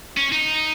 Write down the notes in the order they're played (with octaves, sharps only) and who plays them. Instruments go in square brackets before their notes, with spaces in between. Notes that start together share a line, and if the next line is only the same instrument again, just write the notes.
[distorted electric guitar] C#4
D#4